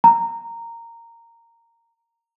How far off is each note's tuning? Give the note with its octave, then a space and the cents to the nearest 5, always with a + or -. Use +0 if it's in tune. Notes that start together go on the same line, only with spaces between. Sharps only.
A#5 -10